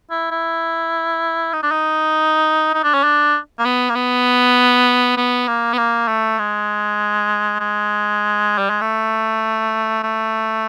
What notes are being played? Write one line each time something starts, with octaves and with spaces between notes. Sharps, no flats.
E4
E4
D#4
D4
D#4
D#4
D4
C#4
D4
A#3
B3
A#3
B3
B3
A#3
B3
A#3
A3
G#3
G#3
G3
G#3
A3
A3